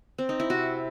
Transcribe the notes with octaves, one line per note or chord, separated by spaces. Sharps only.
C4
D#4
E4
C3 F#4